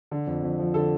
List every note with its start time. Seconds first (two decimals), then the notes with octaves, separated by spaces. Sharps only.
0.11 D3
0.27 F2
0.44 F2
0.59 F3
0.74 D3 A4